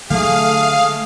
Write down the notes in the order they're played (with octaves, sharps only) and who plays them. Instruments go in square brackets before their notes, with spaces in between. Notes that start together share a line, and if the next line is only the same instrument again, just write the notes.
[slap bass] D3 F#3 G#3 [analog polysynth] A3 [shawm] G#4 [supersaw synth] F5